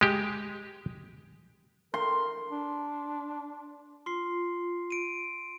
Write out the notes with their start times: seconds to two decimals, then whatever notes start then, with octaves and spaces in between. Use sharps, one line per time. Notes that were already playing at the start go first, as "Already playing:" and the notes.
0.01 G#3 G4
1.94 A#4 C6
2.51 D4
4.06 F4 C6 C7
4.90 D7 D#7